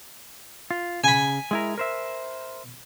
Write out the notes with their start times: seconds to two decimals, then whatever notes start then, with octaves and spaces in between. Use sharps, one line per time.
0.71 F4
1.04 C#3 G#5 B5
1.51 G#3 E4 A#4
1.78 A#4 C5 E5